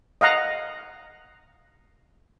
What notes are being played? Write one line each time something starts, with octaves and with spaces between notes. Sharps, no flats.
D#5 F5 F#5 A#5